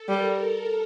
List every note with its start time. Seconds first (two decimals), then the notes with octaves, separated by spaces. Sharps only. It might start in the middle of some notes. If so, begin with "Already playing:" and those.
Already playing: A4
0.08 G3 A#4